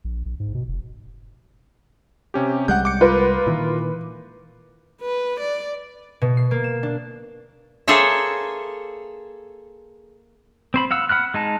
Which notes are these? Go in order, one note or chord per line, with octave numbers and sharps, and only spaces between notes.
A#1
A#1
G#2
B2
F1
C3 C#4 G4
C2 G3 G#3 F#5 F#6 G6
D6 C#7
F4 A#4 B4
A#2 D#3 E3
B4
D5
B2
C7
A#3
E7
D4
A#3 G#4 A4 C5 C#5 E5
C4 C5 B5
F5 F#5 E6
F#5 B5 F6 F#6
G#3 D#4 A5